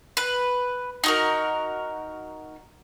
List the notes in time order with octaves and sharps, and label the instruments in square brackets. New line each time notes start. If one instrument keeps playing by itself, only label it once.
[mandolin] B4
D#4 F#4 A#4